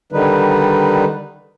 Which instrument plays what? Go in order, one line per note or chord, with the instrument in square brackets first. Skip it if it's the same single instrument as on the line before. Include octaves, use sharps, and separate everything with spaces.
[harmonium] D3 D#3 G3 D#4 B4